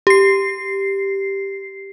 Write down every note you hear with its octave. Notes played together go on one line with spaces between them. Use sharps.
G4 C7